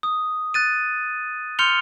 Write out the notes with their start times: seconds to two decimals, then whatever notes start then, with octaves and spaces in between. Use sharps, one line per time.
0.03 D#6
0.54 F#6 A6 D#7
1.59 C6 F6 G6 C#7 F7 G7